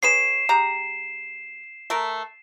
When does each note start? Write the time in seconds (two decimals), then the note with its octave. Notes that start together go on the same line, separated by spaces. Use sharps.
0.03 G#4 B4 C#5 C7 E7
0.49 G#3 G4 A#5
1.90 A3 A#4